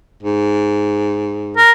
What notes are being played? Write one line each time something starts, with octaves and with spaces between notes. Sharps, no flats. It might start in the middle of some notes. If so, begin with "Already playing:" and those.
G#2
A#4